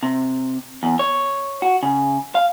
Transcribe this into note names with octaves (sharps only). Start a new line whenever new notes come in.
C3
E2
C#5
F#4
C#3
F5